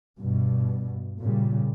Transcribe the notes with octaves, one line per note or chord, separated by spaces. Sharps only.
G2 B2
A#2 C#3 G3